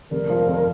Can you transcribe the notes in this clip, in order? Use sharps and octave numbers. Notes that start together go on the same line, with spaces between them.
F1 A#4
F3
F2